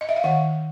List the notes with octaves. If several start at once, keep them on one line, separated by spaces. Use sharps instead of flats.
D#5
E5
F5
D#3 F#5